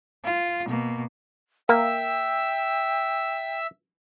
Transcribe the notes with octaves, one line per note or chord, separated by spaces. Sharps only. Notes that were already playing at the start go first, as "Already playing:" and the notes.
F4
B2 A#3
A#3 E5 G5 E6